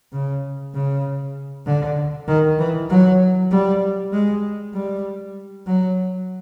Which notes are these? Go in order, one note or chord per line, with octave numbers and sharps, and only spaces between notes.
C#3
C#3
D3
D#3
E3
F#3
G3
G#3
G3
F#3